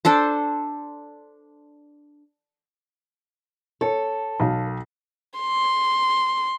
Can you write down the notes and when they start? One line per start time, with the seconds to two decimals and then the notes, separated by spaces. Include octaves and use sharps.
0.05 D4 A4 C5
3.81 A4 C#5
4.40 B1 F5
5.40 C6